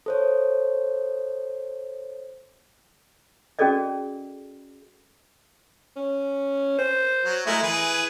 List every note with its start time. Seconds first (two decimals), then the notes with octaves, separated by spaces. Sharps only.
0.06 A4 C5 C#5
3.59 C#4 F#4 G#4 A4 D5 D#5
5.96 C#4
6.79 C5
7.25 F#3
7.46 G#3 A3 E4 A#4
7.62 E3 G#4 B4